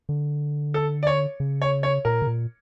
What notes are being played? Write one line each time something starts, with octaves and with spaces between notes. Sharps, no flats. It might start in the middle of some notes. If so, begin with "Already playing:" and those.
D3
A4
D5
C#5
C#3
C#5
C#5
A#2 A#4
C#3
A#2